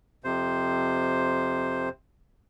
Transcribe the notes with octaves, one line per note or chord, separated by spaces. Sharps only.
F2 C3 C5